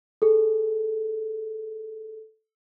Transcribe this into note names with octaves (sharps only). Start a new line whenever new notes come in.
G#4 A4